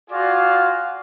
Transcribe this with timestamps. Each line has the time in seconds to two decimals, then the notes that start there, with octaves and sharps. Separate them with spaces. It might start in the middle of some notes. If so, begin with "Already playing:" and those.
0.11 F4 F#4 G#4 D5 F5